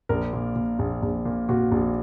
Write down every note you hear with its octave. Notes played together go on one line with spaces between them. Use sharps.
A#1 A#4
A#2
A#2
A#1
A#1
A#2
A#2 F#4
A#1